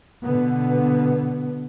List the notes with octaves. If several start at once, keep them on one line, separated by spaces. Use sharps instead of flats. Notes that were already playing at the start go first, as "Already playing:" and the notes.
B2 D3 B3